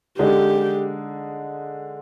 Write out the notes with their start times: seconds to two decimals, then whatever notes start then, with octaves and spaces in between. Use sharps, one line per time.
0.19 D3 G#3 D#4 G4